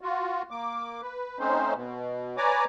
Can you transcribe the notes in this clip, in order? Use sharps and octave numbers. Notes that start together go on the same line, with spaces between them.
F4 F#4
A#3 D6
B4
A3 C4 C#4 D#4 C5
B2
B4 C#5 D5 G#5 A#5 D6